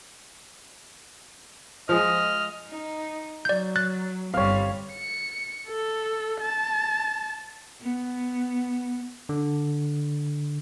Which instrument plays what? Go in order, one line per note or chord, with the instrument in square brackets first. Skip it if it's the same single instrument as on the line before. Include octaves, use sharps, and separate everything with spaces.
[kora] F3 G#3 [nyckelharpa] D#5 [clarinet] F6
[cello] D#4
[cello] F#3 [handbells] D5 G6
[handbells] F#6 A6
[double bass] G1 [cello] G3 C4 [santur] C#5 F5
[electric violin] C#7
A4
A5
[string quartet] B3
[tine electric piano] D3